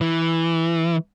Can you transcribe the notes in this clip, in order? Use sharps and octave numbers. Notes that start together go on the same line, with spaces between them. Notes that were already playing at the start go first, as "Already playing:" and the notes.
E3